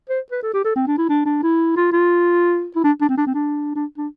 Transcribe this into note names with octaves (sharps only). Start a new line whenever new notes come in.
C5
B4
A4
G4
A4
C4
D4
E4
D4
D4
E4
F4
F4
E4
D4
D4
C4
D4
C4
D4
D4
D4